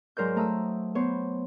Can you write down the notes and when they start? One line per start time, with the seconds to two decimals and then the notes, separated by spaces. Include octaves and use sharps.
0.17 G#2 F#3 A#4 C5 D5 G6
0.36 A3 A#5 D#6 E6
0.95 B3 C5 C#5